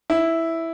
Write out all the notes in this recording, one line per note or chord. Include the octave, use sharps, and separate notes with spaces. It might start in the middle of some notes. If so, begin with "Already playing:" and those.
E4